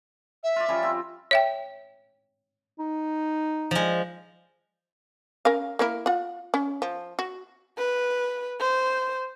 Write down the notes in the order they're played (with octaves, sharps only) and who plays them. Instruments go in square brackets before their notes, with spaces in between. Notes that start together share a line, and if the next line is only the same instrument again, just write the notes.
[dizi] E5
[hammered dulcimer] F4 D5
F3 G3 C#4
C4
[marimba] C#5 E5 G5
[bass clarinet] D#4
[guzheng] F3 G#3
[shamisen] C#4 A#4 F5
A#3 E4 A#4
F4 F#5
C#4
F3
F#4
[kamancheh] B4
C5